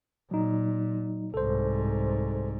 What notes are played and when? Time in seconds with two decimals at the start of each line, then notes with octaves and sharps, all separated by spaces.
0.31 A#2 F#3 D#4
1.34 C2 G#2 A4 C5